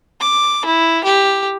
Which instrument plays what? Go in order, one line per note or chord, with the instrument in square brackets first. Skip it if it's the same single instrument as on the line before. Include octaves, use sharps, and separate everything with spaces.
[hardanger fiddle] D6
E4
G4